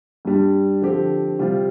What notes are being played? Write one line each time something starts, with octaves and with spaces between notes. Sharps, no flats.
G2 G3 D4
D3 F3 C4 G4
C3 G3 F4